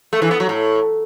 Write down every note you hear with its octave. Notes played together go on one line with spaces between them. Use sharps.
A3
E3
B3
F#3
A2